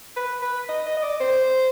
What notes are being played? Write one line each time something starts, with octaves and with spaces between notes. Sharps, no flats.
B4
B4
D#5
D#5
D#5
D5
C5